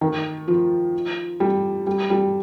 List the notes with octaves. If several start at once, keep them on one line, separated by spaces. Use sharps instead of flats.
D#3
F3
G3
G3
G3